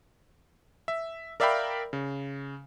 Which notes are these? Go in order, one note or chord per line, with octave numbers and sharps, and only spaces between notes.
E5
A#4 D5 E5 F5 G5 B5
C#3